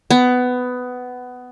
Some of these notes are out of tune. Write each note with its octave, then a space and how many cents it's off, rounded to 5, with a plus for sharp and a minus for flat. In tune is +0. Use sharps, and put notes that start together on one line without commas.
B3 +15